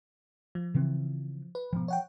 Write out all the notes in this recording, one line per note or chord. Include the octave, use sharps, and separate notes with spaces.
F3
C#3 E3 C4
B4
G#2 B2 F3
C#5 F#5 G5